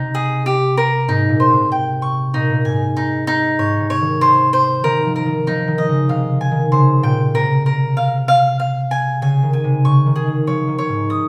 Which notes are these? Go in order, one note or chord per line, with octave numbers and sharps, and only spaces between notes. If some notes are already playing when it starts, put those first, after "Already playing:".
Already playing: C3 D#4
G#4
G4
A#4
G#2 D#4
A#2
C5
C3
G5
C#6
A#2 D#4
A#2
G#2 G#5
D#4
D#4
G#2 C#5
C3
C#5
D#3
C5
C5
D#3 A#4
F3
A#4
D#3
F3 D#4
D#3
D#5
C#3
C3 F5
G#5
D#3
C#3 C5
A#2 G5
C3 A#4
A#4
F5
F5
F5
G#5
C#3 G#5
D#3
G#5
C3
C#3 C#6
D#3
G#4
D#3
F3 C#5
D#3
C#5
G#2
D#6